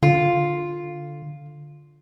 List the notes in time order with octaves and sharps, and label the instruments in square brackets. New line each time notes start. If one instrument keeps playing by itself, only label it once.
[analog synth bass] D3 [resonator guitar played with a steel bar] F4